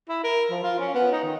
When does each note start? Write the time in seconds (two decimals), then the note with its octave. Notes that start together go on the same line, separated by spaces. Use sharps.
0.09 E4
0.24 A#4
0.50 F3
0.63 F4
0.79 C#4
0.94 B3
1.12 D#4
1.24 D#3